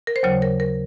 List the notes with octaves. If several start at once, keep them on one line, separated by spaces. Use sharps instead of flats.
A#4
C5
D#2 C#3 F#3 C#5
A#4
A#4